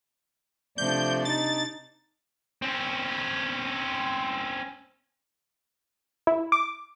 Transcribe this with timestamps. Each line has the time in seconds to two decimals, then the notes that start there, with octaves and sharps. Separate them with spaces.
0.78 C3 F3 A3 D4 D5 G6
1.25 D#4 A6
2.62 C4 C#4
6.27 E4
6.52 D6